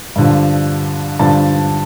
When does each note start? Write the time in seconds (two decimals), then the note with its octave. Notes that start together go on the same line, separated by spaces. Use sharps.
0.16 G2 D3 F3
1.19 G2 D3 F3 A5